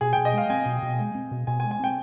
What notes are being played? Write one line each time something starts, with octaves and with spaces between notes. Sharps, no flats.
B2 G#4
G5
B2
D#5
G#3 F5
C4 G#5
B2
B2
G#3
C4
B2
B2 G#5
G#5
G#3
G#5
C4 G5